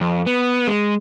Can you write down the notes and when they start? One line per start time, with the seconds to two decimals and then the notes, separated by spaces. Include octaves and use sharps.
0.01 F2
0.26 B3
0.67 G#3